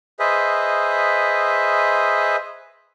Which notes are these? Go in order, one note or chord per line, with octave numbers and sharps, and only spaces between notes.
G#4 B4 C5 D#5 E5